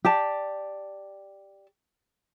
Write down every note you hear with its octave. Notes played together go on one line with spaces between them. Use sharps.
G4 D5 A5